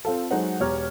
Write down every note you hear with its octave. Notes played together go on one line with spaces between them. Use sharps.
C4 F4 A4
F#3 G#3 D#4 A4 C5 F#5
E1 G4 C#5 A#5 F6